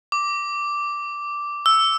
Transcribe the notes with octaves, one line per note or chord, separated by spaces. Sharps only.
D6
E6